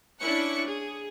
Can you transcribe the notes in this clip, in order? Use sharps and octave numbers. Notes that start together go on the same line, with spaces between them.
C#4 D4 E4 C#6 F#6 C#7
G#4